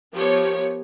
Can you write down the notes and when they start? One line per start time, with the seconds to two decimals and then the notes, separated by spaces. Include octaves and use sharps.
0.15 F3 B3 G4 A#4 C#5